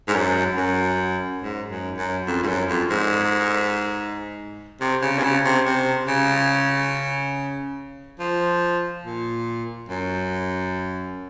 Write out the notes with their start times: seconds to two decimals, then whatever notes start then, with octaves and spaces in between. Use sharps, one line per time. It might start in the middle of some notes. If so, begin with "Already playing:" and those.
0.08 G#2
0.15 F#2
0.57 F#2
1.42 G#2
1.71 F#2
1.98 F#2
2.27 F2
2.43 G#2
2.47 F#2
2.69 F2
2.90 G#2
4.81 C3
5.02 C#3
5.18 C3
5.23 C#3
5.45 C3
5.65 C3
6.07 C#3
8.20 F3
9.04 A#2
9.89 F#2